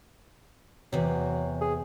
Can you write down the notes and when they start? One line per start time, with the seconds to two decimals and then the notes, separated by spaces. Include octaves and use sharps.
0.93 E2 C3 F#3
1.61 G#4